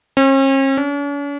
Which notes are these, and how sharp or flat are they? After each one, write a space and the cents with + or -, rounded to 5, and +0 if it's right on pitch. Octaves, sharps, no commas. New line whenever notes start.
C#4 -45
C#4 +45